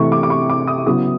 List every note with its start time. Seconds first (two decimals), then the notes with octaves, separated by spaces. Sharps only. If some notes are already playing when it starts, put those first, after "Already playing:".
Already playing: C3 E3 A3 C#6
0.12 D6
0.23 D6
0.30 C#6
0.50 D6
0.68 D#6
0.86 C#3 F#3 B3 E4 D#6